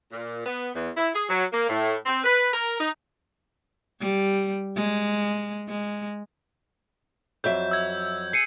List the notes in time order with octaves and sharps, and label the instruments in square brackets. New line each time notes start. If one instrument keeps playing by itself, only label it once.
[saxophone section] A#2
B3
E2
E4
G#4
F#3
A#3
A2
C4
B4
A#4
D#4
[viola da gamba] G3
G#3
G#3
[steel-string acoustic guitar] F2 F#3 E5 [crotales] G6
[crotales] E6 G#6
[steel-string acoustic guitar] G#4 [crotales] C7 C#7 D#7